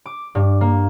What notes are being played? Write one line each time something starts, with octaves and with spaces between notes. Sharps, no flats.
D6
G2
A#3